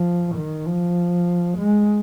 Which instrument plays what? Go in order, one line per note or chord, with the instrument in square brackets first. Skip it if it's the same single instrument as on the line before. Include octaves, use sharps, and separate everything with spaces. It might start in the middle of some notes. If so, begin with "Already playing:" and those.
Already playing: [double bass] F3
D#3
F3
G#3